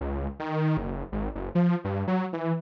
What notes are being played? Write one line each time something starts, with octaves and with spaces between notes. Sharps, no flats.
C#2
D#3
F#1
G#1
F#1
F3
G2
F#3
E3